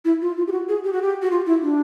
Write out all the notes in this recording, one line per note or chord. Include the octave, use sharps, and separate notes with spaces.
E4
F4
F4
G4
F#4
G#4
G4
F#4
G4
F#4
F4
E4
D4